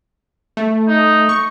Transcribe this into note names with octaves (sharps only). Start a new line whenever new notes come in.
A3
D#4
C#6